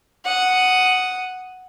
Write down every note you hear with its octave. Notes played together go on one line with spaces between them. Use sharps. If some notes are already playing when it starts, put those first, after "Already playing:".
F#5 D#6